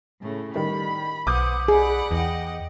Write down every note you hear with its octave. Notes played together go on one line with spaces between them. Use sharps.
A2 C#3 A3
D#3 G3 B5
B1 B4 C5 F#5 D6 D#6 G6
G#4 D5 F#5 B5
E2 D#5 F#5 G5